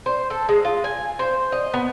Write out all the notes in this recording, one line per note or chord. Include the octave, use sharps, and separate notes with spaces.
C5
A4
G#3
F4
G#5
C5
D#5
B3